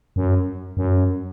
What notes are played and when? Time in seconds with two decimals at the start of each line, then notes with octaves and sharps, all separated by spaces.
0.16 F#2
0.77 F#2